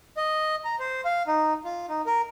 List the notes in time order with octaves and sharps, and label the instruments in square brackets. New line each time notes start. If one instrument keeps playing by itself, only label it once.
[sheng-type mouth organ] D#5
A#5
C5
F5
D#4
F4
D#4
A#4